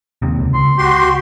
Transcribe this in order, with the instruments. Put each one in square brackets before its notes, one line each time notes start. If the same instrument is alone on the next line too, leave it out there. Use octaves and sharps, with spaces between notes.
[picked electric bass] D#2 C3
C#2
[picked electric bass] C#2 [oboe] C6
[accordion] F#4 C6 [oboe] G4
[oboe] G4